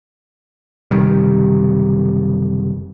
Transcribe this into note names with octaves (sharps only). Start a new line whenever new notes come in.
F#1 C3 D#3 G3